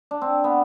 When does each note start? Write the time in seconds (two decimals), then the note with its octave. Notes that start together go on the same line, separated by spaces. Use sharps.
0.11 D4
0.22 C4
0.44 B3